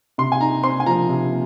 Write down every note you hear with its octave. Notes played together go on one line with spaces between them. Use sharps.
C3 C6
G#5
D#4 A#5
C4 C6
G#5
F3 A#5
C3